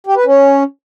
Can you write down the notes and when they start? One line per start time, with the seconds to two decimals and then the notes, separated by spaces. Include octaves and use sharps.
0.07 G4
0.16 B4
0.26 C#4